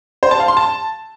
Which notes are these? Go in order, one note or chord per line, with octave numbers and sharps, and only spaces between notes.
C5
A5
F5
C6
A5